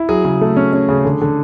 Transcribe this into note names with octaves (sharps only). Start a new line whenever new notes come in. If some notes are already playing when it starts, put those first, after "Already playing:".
Already playing: E4
F#3 G#4
C#3
A3
C#4
C#4
C#3
D3
D3